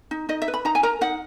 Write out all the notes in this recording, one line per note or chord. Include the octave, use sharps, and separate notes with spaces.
D#4
D#4 D#5
E5
B4
B5
D#4 A#5
G#5
A#4 A#5
D#4 F#5